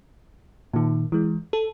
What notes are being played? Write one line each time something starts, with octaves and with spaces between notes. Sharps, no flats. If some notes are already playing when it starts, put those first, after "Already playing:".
A#2 D#3
E3 G#3
A4